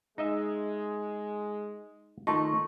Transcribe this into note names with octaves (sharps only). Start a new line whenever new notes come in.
G#3 D#4 D#5 E5
D#3 A3 D#4 F4 A5 C6 C#6